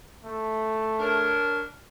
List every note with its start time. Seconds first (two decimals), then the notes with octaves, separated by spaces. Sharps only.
0.24 A3
0.99 D4 A#4 C#5